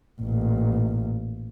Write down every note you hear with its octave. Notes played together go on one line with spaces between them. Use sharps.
A1 A#2